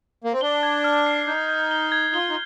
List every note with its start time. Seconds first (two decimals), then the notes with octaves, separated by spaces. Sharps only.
0.24 A#3
0.33 C4
0.41 D4 G7
0.63 G#6
0.84 F6
1.06 C7
1.27 D#4 G6
1.48 G6
1.71 G7
1.92 G#6
2.14 F4 G7
2.30 D#4